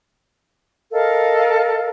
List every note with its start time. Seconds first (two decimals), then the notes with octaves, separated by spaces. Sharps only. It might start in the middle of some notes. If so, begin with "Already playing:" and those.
0.91 A4 A#4 D#5 F5